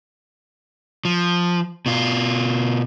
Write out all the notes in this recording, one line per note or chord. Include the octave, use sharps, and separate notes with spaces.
F3
B2 F4